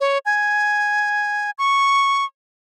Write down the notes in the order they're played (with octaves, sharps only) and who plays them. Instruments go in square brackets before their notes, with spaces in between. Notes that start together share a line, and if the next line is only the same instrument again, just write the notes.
[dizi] C#5
G#5
C#6